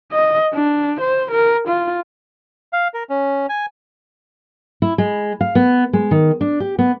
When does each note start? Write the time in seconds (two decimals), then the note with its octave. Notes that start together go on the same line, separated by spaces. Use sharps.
0.12 D#5
0.54 D4
1.01 C5
1.31 A#4
1.68 F4
2.73 F5
2.94 A#4
3.10 C#4
3.49 G#5
4.82 E4
4.98 G#3
5.41 F5
5.55 B3
5.93 G#3
6.11 D#3
6.41 D4
6.60 G4
6.79 B3